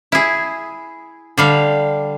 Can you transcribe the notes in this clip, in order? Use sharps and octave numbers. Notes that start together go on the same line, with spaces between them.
E4 G#4
D3 G3 F5